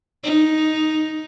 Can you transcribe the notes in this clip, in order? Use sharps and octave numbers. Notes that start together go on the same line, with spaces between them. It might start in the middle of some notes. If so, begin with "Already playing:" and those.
D#4